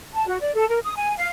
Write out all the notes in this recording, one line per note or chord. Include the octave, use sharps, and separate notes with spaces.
A5
F#4
D5
A4
A#4
D#6
G#5
F5